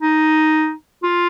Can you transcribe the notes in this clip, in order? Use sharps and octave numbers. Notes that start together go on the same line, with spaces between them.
D#4
F4